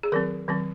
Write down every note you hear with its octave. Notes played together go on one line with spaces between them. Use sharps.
G#4
D#3 F#3 C4 A#4
D#3 F#3 C4